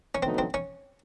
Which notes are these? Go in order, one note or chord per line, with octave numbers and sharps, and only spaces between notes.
C#4
D2 D3 F#3 B3 C4 D#4
C4
C#4